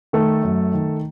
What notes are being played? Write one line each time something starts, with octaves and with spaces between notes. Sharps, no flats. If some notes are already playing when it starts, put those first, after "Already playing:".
D#3 A3 A4
F#2
D#3